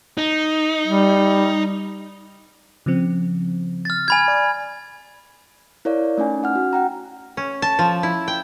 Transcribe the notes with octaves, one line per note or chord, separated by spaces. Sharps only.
D#4
G3
C#3 F3 C4
F6 A6
G#5 B5 G#6
D5
E4 A#4 C#5 D5 F5
A3 C#4 D#4 G#5
C#4 F#5 F6
F#4
F#5 G5 A#5
C#4
A5
F3
E4
G5